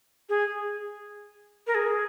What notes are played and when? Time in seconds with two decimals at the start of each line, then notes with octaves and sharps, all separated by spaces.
0.29 G#4
1.67 A#4
1.75 G#4